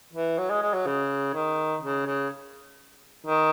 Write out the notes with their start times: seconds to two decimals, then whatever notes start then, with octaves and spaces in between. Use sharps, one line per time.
0.13 E3
0.38 F#3
0.50 G#3
0.62 G#3
0.74 F#3
0.86 C#3
1.34 D#3
1.82 C#3
2.06 C#3
3.26 D#3